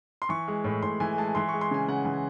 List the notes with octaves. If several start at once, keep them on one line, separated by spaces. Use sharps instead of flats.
C6
E3 C#6
G#3
A2
A2 C6
E3 G#5
G#3 A5
E3 C6
G#3 C#6
C6
C#3 G#5
C#3 F#5
E3